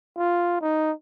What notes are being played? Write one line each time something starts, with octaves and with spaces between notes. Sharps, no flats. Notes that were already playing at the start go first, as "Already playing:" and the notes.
F4
D#4